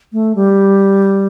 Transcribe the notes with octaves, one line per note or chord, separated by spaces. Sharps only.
A3
G3